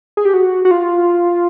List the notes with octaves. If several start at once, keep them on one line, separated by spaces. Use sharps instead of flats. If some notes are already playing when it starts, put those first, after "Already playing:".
G#4
G4
F#4
F#4
F4